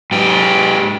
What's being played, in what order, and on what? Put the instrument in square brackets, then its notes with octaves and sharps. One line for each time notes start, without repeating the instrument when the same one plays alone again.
[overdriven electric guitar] G#2 G4